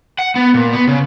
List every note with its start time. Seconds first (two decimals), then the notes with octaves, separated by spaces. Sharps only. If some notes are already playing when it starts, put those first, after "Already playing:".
0.19 F#5
0.36 B3
0.54 A#2
0.73 B3
0.87 C#3